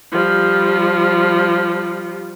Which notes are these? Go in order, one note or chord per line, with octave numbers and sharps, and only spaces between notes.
F3 G3